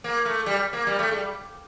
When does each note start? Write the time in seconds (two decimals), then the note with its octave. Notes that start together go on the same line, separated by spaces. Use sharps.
0.04 A#3
0.25 A3
0.46 G3
0.73 A#3
0.87 G3
0.99 A3
1.11 G3